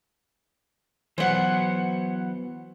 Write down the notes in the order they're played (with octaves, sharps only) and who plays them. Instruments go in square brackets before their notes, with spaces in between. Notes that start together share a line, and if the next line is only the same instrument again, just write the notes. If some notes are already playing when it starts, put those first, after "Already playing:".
[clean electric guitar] E3 F#3 B3 [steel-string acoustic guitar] C5 F#5